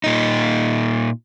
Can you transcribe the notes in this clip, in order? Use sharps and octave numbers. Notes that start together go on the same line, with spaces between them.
A#2 D#4